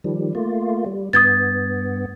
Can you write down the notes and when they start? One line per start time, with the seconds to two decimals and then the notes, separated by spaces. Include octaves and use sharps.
0.04 D#3 F3 G3
0.35 A3 A#3 F4
0.86 G3
1.13 G2 B3 D#6 G#6 A6